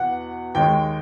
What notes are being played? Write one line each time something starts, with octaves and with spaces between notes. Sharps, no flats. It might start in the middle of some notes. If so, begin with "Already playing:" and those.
Already playing: E2 B2 F#5
D#2 D#3 G#3 G5